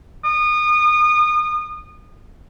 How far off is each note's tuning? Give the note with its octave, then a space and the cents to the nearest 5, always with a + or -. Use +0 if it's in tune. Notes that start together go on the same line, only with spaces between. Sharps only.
D#6 -30